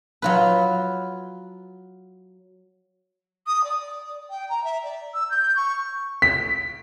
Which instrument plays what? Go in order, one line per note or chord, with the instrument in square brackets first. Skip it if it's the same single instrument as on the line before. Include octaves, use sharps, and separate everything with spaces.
[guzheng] F#3 F4 B4
[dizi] D#6
D5
G5
A#5
E5
D5
E6
G6
C#6
[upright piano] B6